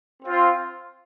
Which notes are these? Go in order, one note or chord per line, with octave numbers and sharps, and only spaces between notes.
C4 F4